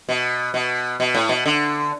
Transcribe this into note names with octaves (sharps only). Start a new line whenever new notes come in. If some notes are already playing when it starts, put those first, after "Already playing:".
B2
B2
B2
A2
B2
D3